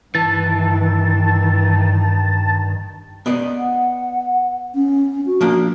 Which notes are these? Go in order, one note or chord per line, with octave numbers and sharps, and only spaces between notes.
G2 D#3 E3 A5
B3 D5 D#5
F#5
C#4
F#4
F3 A#3 D4